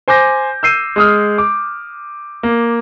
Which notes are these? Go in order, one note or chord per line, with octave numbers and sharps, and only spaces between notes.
C5 G#5 D6 G6 A#6
E6 G6 C7 D#7
G#3 D#6 F6
D6
A#3